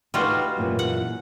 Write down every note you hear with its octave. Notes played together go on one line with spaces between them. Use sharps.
G3 D#4 F4 F#4 B4
F#2 A#2 E3
F#5